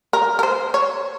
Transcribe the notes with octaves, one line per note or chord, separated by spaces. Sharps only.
A#4
A#4
C5
C#5